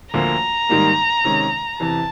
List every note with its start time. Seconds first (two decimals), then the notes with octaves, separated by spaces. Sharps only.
0.14 D2 D3 F3 A#3 A#5
0.69 G#2 D#3 G3 A#3
1.24 C3 D#3 G#3 C#4
1.79 E2 C3 E3 A5